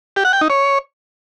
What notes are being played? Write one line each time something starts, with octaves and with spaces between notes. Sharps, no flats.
G4
F#5
G5
D#4
C#5